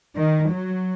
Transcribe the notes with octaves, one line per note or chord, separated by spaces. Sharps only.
D#3
F#3